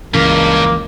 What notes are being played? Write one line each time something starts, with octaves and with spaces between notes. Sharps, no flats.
C#2 G2 C#3 E3 A#3 C#4